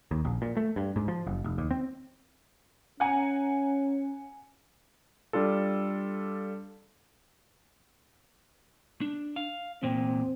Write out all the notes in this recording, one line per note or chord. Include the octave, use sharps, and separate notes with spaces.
D#2
A#1
A#2
A3
G2
G#2
F3
F#1
F1
D#2
C4
C#4 F#5 G#5 A#5
G3 D4 F4 A4
D4
F5
E2 A#2 C4